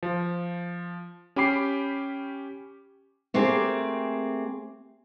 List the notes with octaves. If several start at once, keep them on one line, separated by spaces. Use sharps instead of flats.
F3
C#4 G4 G5 B5 D6 C7
A3 A#3 C4 G4 G#4